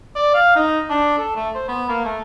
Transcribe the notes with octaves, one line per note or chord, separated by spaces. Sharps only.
D5
F5
D#4
D4
A4
A3
C5
B3
A#3
A3